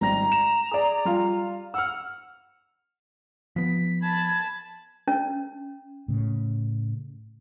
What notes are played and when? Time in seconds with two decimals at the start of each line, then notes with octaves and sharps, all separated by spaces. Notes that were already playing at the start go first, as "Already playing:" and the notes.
0.01 G#1 G3 A#5 A#6
0.32 E7
0.71 G#4 D5
1.05 G3 F4
1.74 F#5 E6 F6
3.56 F3 B3 B6
4.02 A5 B5 G#6
5.08 C#4
6.08 A2 C#3